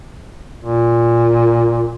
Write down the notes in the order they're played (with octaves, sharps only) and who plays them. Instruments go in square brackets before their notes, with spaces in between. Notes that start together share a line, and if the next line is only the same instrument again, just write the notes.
[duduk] A#2